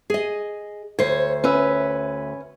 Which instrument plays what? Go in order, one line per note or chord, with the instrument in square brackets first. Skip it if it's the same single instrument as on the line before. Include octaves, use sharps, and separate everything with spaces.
[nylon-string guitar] G#4 D#5
[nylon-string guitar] D2 C5 [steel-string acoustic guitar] C#5
[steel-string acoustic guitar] C#4 B4 E5